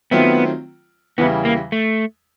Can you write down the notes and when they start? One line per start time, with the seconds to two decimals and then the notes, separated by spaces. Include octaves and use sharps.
0.11 D#3 F#3 A3 B3 C4 F4
1.18 E2 C#3 E3 G3 B3
1.45 A#3
1.72 A3